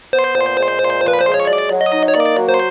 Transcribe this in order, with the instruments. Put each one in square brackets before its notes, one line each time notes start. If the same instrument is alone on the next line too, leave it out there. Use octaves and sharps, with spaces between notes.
[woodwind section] B3 [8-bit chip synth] C5
[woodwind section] A#2
G#3
A#2
F3
[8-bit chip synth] B4
[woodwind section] G#3 [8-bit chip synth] C5
[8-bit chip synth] C#5
[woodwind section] F#3 [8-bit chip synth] D5
[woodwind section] F#3
[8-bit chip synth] D#5
[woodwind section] D#4
[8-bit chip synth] C#5
[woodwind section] A#3 [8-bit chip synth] D5
[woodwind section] F#3
[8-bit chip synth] C5